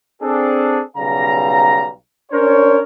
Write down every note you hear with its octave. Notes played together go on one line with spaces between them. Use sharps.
C4 D4 G#4 A4
B1 C#3 G3 F5 A#5
C#4 D4 A#4 C5 C#5